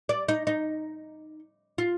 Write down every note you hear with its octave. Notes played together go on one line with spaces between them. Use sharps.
D5
D#4
D#4
F4